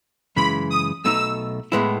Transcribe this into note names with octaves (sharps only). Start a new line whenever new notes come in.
F#2 C#3 E3 G#3 B5
D#6
B1 B2 A3 D#4 E6
A2 G#3 B3 E4